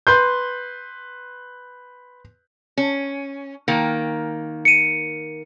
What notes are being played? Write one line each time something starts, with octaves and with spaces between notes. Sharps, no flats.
B4 C6 G6
C#4
D#3 A#3
C#7 D#7